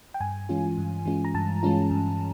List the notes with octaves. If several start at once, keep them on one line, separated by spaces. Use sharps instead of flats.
G5
G2 G#5
E3 G#3 C#4 F4
G2
E3 G#3 C#4 F4
A#5
G2 A5
E3 G#3 C#4 F4
G2